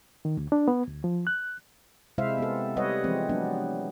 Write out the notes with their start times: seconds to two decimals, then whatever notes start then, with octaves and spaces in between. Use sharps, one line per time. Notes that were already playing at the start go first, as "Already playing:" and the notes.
0.25 D#3
0.37 D2
0.52 D4
0.68 B3
0.88 D2
1.04 F3
1.27 F#6
2.18 C3 G#3 E4 C5 E5 F5
2.38 B3 C4 A4
2.76 G3 G4 B4 C#5 D#5 F#5
3.04 E3 F3 G#3 C4
3.29 F#3 B3 D4